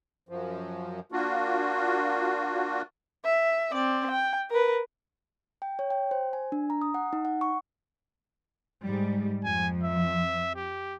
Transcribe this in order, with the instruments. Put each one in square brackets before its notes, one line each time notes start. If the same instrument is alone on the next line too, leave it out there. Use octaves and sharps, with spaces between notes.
[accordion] F#2 F3
A#3 D4 F4 F#4
[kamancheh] E5
C4 D5
G5
A#4 B4
[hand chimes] G5
C#5
G5
C5
G#5
D4
A#5
D#6
F#5
D#4
F#5
C#6
[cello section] G#2 G3
[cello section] F2 F3 [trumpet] G#5
[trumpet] E5
G4